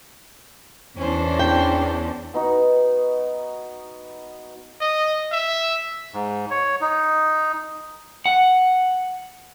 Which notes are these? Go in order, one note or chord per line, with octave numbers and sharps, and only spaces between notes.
E2 E3 C#4 D4 C5
G5
B3 D#4 F#4
D#5
E5
G#2
C#5
D#4
F#5